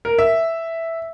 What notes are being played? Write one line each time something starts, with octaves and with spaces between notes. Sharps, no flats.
A#4
E5